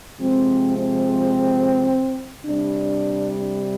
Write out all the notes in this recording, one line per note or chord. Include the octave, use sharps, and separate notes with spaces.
C3 F3 G#3 C4
C4
C3 G3 D4